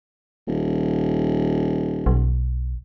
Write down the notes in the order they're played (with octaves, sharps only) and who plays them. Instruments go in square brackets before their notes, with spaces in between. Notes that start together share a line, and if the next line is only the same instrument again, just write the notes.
[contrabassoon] D#1
[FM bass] B1